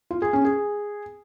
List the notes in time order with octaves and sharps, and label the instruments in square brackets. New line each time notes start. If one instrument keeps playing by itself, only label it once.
[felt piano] F4
G#4
C#4
G#4